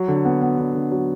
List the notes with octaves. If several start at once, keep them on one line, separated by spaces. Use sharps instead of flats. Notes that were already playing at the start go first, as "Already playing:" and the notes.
Already playing: F#3
D3
B3
B3
D3
D3
F#3